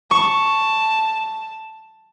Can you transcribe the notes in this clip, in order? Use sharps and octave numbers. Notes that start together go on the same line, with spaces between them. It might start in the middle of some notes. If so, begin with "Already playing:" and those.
A5 C#6